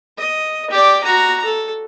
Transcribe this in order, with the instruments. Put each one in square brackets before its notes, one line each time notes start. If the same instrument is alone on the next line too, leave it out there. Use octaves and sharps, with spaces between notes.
[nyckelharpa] D#5
G4 D5
F#4 A#5
A4